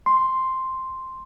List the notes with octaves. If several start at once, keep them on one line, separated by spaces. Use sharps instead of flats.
C6